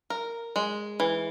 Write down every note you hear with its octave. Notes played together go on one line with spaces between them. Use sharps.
A#4
G#3
E3